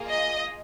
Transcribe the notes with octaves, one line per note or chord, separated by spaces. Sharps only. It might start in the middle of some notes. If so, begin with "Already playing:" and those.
Already playing: A#3 F4 G#4
D#5